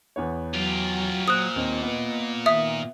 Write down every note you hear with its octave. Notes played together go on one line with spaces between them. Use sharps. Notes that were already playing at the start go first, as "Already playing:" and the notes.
E2 B3 C#5
F#3 F4 G4
A#2 C5 D#6 F#6
D#2 C4 D#5
B3
D#3 E5 D#6